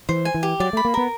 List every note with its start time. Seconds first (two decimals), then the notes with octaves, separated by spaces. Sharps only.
0.09 E3 C5
0.25 G#5
0.34 E3
0.43 G4
0.60 F#3 D5
0.73 A3 B5
0.85 A#3
0.94 B3 A#4